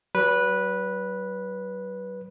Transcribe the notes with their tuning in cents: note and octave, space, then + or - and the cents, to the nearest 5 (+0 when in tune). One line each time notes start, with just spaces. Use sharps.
F#3 +40 B4 -10